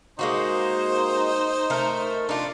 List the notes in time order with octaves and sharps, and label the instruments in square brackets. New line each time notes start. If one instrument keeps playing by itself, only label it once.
[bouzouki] G#3 A#3 F#4 [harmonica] D#4 C5
[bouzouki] A3 A#4
[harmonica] D4 [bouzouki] D#4 F4